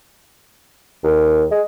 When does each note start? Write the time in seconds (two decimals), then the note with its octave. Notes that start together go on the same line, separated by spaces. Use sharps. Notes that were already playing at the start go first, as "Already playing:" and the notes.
1.04 D#2
1.51 G#3